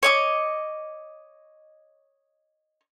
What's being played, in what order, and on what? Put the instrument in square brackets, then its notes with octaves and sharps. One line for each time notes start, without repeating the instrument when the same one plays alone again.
[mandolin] C#5 D#5 D6